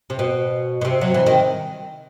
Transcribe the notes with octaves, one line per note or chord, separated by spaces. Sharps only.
C3
B2
B2
C3
F#3
E3
D#3